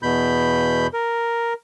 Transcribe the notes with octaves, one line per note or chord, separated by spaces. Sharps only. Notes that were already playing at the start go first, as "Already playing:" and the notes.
E2 B2 B5 G6
A#4